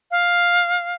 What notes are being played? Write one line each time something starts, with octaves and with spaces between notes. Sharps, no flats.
F5